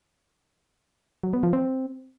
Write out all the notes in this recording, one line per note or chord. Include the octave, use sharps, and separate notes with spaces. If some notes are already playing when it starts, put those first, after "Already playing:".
F#3
B3
F3
C4